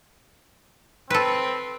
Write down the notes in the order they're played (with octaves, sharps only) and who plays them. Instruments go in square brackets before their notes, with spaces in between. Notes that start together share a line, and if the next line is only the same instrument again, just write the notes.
[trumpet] C4 [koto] A4 B4